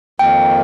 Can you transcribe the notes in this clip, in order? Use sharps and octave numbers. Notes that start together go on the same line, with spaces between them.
F2 D#3 A#3 G5